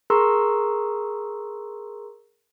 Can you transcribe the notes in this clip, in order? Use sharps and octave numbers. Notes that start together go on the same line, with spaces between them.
G#4 A#4 A#5 C6 C#6 E6